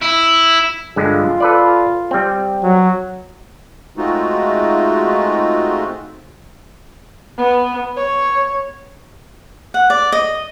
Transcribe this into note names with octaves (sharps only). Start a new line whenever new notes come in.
E4
G2 D3 G#3 F4
A4 B4 D5
G3 C4
F#3
G#3 A3 C4 D#4 F4 F#4
B3
C#5
F#5
D5
D#5